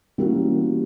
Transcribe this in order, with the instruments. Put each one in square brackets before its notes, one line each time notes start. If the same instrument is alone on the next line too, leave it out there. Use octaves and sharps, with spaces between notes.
[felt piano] E3 G3 A#3 C#4 F#4